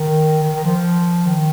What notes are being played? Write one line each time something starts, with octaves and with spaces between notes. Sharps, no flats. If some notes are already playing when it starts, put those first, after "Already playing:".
Already playing: D#3
D#3
D#3
F3
D#3